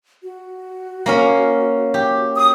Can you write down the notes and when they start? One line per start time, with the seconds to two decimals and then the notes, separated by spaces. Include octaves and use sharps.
0.23 F#4
1.06 A#3 C#4 F5
1.94 G4
2.36 D#6